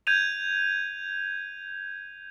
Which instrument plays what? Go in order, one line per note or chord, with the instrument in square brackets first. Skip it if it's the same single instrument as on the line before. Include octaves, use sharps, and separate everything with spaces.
[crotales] G6 G#6 D#7 F7